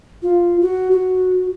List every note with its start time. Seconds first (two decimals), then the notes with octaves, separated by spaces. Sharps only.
0.22 F4
0.62 F#4
0.91 F#4